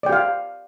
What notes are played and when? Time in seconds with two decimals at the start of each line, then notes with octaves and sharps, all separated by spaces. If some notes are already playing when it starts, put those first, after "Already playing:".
0.03 D5
0.06 G5
0.09 G4
0.12 F5